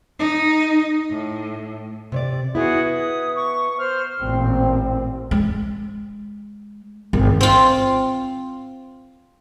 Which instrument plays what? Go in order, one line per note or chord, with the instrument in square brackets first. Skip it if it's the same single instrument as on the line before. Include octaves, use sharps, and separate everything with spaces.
[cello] D#4
A2
[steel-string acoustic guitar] C3 C#5 D5
[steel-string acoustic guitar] B3 E4 [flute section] F#4 G#4 D#6
[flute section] D#6
C#6
C5 F6
[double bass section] A1 A#2 C4
[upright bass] G#3
G#1
[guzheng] C4 F4